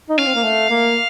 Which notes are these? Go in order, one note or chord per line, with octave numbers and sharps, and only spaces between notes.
D#4
C#4 F5
C4
A#3
A3
A#3